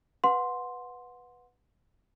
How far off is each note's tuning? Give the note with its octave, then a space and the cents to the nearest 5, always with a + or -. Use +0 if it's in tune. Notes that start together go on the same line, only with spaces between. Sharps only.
B4 +0 F#5 -20 C6 +0